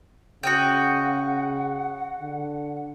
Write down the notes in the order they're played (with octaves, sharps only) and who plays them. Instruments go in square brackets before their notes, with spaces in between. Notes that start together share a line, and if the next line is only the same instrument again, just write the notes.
[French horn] C#3 [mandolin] F#4 D#5 G5 [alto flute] F#5
[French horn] D3